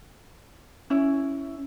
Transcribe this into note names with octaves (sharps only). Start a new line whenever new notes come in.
C#4 E4